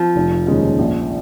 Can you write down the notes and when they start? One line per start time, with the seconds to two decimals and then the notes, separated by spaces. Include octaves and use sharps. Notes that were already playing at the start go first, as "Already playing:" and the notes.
Already playing: F3 C4
0.16 F1
0.47 D#2 C#3 G#3 C#4
0.78 A#1